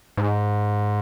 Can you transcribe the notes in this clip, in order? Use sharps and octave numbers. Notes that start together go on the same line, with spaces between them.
G#2